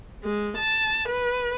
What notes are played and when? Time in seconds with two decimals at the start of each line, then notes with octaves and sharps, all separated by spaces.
0.24 G#3
0.57 A5
1.08 B4